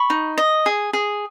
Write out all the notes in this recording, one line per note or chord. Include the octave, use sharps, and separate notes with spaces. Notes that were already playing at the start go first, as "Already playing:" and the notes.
Already playing: B5 C#6
D#4
D#5
G#4
G#4